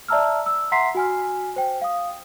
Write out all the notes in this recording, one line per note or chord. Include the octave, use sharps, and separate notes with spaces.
D5 E5 A5 A#5 E6 F6
E6
E5 F#5 A#5 C6 B6 C7
F#4 G#5 F6
C5 G5
F5 D#6